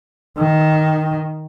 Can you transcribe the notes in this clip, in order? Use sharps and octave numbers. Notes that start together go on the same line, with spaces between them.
D#3